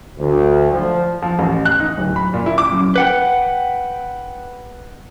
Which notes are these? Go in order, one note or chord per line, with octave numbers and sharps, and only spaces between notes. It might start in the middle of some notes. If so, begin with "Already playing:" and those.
D2
F3
F3
A1
F#6
D#4
D1
B5
A#2
E4
D6
F#2
B4 F#5 G5